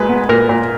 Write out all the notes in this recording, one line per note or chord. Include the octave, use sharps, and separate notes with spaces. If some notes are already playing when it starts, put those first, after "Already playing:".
Already playing: A#2 G#3 B4
B3
A#2 A#4
A#2